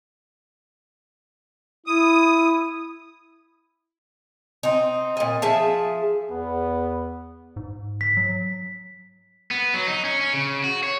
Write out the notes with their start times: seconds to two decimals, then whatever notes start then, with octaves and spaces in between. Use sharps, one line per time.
1.86 E4 D#6
4.63 C4 D#4
5.17 A#2 D#5
5.42 F3 G#4 E5 A5
6.30 E2 B3
7.56 G#2
8.01 B6
8.17 F#3
9.51 B3
9.74 F#3
9.87 D#4
10.05 C#4
10.20 C#4
10.33 C#3
10.64 F#4
10.83 C#5